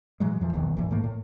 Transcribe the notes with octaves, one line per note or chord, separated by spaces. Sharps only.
A#2 E3 F#3 G#3
F2 E3 F3
D#1 B1 E2 D#3
D#1 G#1 E3
G#2 A3 A#3
A2